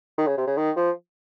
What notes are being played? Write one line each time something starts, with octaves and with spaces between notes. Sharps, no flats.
D#3
C#3
C3
C#3
D#3
F3